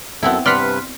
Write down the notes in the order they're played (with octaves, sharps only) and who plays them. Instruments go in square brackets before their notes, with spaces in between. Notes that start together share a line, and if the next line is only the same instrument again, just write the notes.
[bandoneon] F#2 A4 [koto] B3 C4 E4
[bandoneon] G2 C3 B4 [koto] D5 F#5 [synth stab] C6 F6 B6